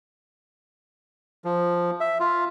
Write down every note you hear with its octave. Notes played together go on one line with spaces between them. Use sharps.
F3
E5
F4